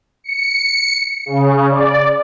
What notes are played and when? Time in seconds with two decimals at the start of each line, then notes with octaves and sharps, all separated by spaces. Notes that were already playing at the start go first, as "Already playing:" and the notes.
0.24 C#7
1.26 C#3
1.70 D5